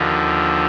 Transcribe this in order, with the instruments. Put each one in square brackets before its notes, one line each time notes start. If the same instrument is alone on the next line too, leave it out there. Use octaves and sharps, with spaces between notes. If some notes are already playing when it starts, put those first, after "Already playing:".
Already playing: [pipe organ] D#2 D3 F3